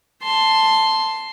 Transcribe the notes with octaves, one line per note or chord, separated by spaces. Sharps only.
A5 C6